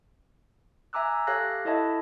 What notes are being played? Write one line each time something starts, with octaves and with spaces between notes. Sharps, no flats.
E5 G#5 A#5 D6 E6 F#6
G4 A4 C#5 F5 F#6 A#6
E4 A4 C#5 D#5 E5 A5